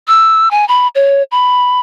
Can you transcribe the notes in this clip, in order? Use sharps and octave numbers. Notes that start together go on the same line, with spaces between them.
E6
G#5
B5
C#5
B5